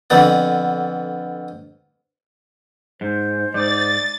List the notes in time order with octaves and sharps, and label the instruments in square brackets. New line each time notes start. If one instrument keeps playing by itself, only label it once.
[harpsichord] F2 D3 B3 D5
[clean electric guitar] G#2 [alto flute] C5
[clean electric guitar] G#2 [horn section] D#4 D5 [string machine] A6